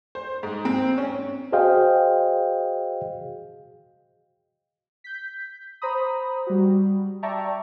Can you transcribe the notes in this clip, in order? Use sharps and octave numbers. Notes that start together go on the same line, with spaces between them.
C5
G#2
C4
C#4
F#4 G#4 C5 D#5 F5 G5
G6 B6
C5 A#5 B5 D#6
G3 F#4
D5 E5 G5 A5 A#5 C#6